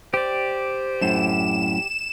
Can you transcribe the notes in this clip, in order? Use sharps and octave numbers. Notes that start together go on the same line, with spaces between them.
G4 C5 D5
F#2 A2 E7